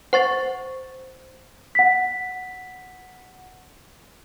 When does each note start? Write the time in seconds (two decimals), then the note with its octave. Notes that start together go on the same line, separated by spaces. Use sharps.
0.13 C5 F#5 C#6 A6
1.75 F#5 B6